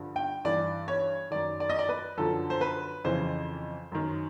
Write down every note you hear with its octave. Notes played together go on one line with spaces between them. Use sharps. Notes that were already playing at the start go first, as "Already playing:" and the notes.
Already playing: G2 D3 F3
G5
G2 E3 D5
C#5
F#2 D#3 D5
D5
D#5
D5
B4
F#2 D3 F3 A4
C5
B4
F2 C#3 E3 C5
F#2 D#3